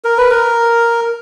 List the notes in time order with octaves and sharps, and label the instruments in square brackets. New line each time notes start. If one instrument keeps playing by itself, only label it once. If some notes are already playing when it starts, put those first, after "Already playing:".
[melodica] A#4
B4
A#4